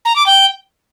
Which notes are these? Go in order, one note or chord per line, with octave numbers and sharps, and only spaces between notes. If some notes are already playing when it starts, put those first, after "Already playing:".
A#5
D6
G5